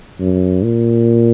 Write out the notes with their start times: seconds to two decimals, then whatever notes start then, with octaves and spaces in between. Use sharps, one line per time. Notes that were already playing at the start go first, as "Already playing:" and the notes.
0.20 F#2
0.64 A#2